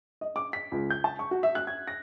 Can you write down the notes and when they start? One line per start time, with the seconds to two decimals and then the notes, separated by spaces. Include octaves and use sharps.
0.21 D#5
0.36 D6
0.53 B6
0.72 C#2
0.90 G6
1.04 A5
1.19 C#6
1.31 F#4
1.43 E5
1.55 F#6
1.67 G#6
1.88 A#6